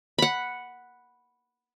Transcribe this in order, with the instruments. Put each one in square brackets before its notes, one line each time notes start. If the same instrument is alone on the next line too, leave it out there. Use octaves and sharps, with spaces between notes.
[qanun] F#5 B5